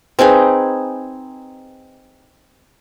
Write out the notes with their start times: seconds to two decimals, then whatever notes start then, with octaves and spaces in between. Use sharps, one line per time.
0.19 C4 D#4 G#4 B4